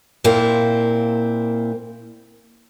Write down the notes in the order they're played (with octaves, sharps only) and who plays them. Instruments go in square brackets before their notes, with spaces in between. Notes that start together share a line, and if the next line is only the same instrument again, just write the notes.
[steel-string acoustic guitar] A#2 A#3 C4 E4